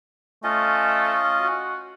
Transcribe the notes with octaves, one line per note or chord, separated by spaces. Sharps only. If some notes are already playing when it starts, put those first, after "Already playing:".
A3 C#4 F4 D#5
F#4